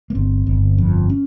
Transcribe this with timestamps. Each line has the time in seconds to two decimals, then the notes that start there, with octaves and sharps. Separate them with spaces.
0.10 A#3
0.15 G1 C4
0.47 G1
0.78 F2
1.09 C#4